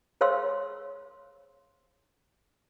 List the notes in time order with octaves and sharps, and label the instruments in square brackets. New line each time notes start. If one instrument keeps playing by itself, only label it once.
[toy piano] G#4 C5 C#5 F5 C6 E6